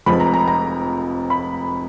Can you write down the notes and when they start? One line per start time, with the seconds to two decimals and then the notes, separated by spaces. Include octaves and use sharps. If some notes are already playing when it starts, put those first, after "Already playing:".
0.06 F1 F2 F3 G#3 B5
0.20 A#5
0.34 A#5
0.48 A#5
1.30 B5